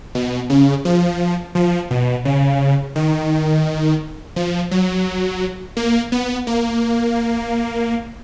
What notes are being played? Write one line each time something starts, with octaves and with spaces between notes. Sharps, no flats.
B2
C#3
F3
F3
B2
C#3
D#3
F3
F#3
A#3
B3
A#3